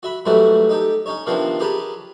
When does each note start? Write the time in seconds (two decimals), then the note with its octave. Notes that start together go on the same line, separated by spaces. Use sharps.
0.03 F#4 E5 B5
0.26 G#2 E3 F#3 G3 A3 F#4
0.69 D#4 G4 A4
1.06 C#4 D#4 C#5
1.26 C3 D#3 F3 B3 C4 D4
1.60 G4 G#4 A#4 B4 C#5 A5